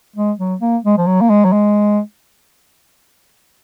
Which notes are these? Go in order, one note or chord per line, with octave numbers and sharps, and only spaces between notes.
G#3
F#3
A#3
G#3
F3
F#3
A#3
G#3
F#3
G#3